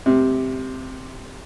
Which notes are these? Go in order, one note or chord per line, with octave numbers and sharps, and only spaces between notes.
C3